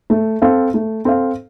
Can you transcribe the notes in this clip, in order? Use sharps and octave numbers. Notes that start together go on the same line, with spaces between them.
A3
C4 A4 F5
A3
C4 A4 F5